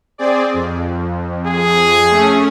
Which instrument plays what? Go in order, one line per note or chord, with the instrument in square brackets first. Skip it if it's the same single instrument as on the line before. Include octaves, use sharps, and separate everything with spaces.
[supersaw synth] C4 G#4 D5
F2
[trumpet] G#4
[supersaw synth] A3 C#4